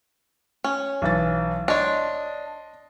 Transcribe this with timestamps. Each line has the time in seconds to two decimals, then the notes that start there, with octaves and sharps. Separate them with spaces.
0.64 C#4
1.02 B1 E3 A6
1.68 D4 C#5 D#5 C6